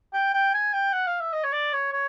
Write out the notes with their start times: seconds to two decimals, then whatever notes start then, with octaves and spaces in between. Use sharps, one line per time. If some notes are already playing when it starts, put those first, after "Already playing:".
0.14 G5
0.34 G5
0.54 G#5
0.74 G5
0.93 F#5
1.07 F5
1.20 E5
1.33 D#5
1.44 C#5
1.52 D5
1.73 C#5
1.93 C#5